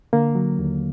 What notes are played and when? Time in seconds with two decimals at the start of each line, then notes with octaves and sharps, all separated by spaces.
0.13 D3 A#3
0.35 F#3
0.59 D#2